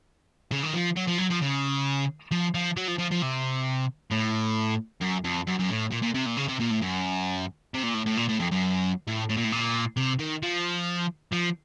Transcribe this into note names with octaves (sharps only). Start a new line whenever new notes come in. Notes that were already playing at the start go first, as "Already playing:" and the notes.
C#3
D#3
F3
F#3
F3
F#3
F3
C#3
F3
F3
F#3
F3
F3
F3
C3
A2
F#2
F2
F#2
F#2
A2
A#2
A#2
C3
A#2
C#3
C3
A#2
A2
F#2
C3
A#2
A2
A2
A#2
A2
F2
F#2
A2
A2
A#2
A2
A#2
C3
D#3
F3
F3